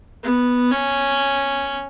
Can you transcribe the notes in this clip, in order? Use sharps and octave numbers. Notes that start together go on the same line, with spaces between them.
B3
C#4